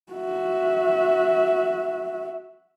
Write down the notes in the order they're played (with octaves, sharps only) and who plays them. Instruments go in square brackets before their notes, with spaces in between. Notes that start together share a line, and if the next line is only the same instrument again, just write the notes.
[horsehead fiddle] F#4 E5